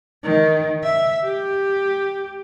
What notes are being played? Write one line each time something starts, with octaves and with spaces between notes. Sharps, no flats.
D#3
E5
G4